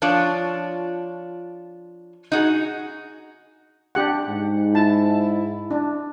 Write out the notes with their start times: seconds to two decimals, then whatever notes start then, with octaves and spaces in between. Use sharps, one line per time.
0.02 F3 D4 F4 C#5
2.32 D#4 F#4 G#4
3.95 D4 G4 F#5
4.28 G#2
4.75 E4 A5
5.71 D4